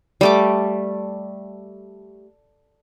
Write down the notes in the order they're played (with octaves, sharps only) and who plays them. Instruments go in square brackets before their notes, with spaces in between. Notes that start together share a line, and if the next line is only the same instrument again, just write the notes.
[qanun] G3 A3 D6